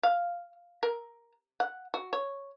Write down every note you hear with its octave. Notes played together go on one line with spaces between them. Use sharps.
F5
A#4
F#5
F#4
C#5